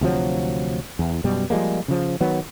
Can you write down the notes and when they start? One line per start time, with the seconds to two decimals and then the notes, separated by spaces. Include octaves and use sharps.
0.01 D2 C3 F3 F#3
0.99 E2
1.24 F#2 B2 G3
1.50 F3 G3 G#3 A#3
1.88 C#3 F3
2.20 D#3 F#3 B3